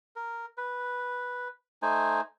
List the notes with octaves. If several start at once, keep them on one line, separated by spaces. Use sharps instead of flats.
A#4
B4
A3 D#4 C5 G#5